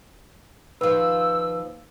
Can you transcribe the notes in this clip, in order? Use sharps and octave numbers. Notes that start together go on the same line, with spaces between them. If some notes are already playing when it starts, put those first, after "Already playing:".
D#2 F3 B4 E6